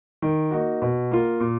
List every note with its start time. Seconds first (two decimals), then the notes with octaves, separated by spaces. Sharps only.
0.22 D#3
0.51 A#3 D#4 F#4
0.82 B2
1.11 A#3 F4
1.40 A#2